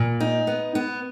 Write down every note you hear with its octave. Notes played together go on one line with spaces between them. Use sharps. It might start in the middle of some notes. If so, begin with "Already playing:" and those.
Already playing: A#2
D#4
B3
B3